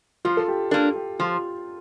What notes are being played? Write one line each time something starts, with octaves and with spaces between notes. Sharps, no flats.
F3 F4
A4
G4
A#3 D4 A4
G4
F3 F4